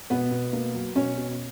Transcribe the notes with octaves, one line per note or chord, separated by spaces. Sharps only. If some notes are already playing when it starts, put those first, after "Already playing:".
B2 B3 B4
B2
A#3
F#3
B2 C#4 C#5
B2